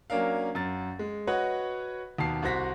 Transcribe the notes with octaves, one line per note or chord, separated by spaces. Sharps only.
F#3 A#3 C#4 D4 A#4 F5
F#2 A6
G#3
F#4 B4 C#5 D#5 F#5
D#2 B2 A5 C7
C2 F#4 C5 A#6 B6